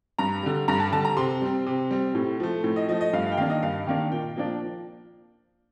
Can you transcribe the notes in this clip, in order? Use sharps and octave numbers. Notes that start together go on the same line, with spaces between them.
G2 A#5
D3 G3
G2 A#5
A5
D3 G3 A5
A#5
C3 C6
G3 C4
C3
G3 C4
A2
F3 A3
A2
D#5
F3 A3 D#5
D#5
G2 F5
F5
G5
D#3 A#3 D4 F5
D#5
G2 F5
D#3 A#3 D4
A#2 G5
F3 A#3 D4